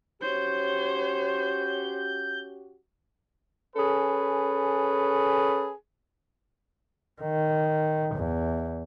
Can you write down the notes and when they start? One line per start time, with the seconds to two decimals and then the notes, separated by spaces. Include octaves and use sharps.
0.22 C#4 F#4 G4 C5 C#5 G6
3.76 C#4 G#4 A4 B4
7.22 D#3
8.15 E2